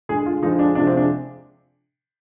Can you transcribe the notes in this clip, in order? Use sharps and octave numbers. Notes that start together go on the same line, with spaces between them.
D3 G#3 G#4
F4
D3 F3 G#3 D#4
D4
C3 F3 G#3 D4
C4
D4